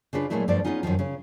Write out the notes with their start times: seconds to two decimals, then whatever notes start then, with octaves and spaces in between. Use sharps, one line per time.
0.13 C#3 D4 F4 B4
0.30 A#2 E3 F#3 G#3 A3 E4
0.48 G2 F3 A3 D5
0.64 G#3 A#3 B3 C#4 D#4 F4
0.83 F#2 A2 D#3 F3
0.99 C#3 C#4